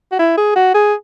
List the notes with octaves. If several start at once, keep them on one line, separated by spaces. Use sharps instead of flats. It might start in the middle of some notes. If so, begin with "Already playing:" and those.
F#4
E4
G#4
F#4
G#4